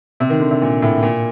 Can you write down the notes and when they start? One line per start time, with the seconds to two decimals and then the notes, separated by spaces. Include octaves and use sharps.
0.20 C3
0.30 D#3
0.40 D3
0.51 C3
0.62 A#2
0.82 A2
1.02 A#2